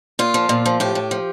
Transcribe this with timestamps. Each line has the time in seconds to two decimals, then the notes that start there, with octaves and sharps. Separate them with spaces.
0.19 A#2 F4
0.34 F3
0.49 A#2
0.66 F3
0.80 A2 G4
0.95 A2
1.11 F3